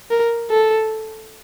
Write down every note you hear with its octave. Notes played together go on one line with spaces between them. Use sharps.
A#4
A4